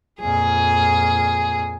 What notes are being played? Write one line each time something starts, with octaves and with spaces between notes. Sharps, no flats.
F2 A#2 G#4